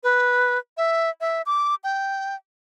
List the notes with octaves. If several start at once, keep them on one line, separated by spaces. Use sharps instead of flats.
B4
E5
E5
D6
G5